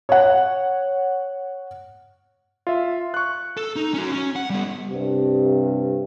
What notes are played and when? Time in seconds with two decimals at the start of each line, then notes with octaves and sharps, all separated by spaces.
0.09 C#5 F#5
2.67 F4 E5
3.14 C#6 F#6
3.57 A4
3.76 D#4
3.94 C#4 F#4
4.12 C#4
4.36 F#5
4.50 G3 B3
4.91 C2 G2 C3